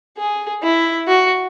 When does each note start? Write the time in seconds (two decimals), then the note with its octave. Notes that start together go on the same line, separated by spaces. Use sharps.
0.18 G#4
0.63 E4
1.08 F#4